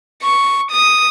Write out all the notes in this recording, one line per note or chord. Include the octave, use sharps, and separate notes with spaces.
C#6
D#6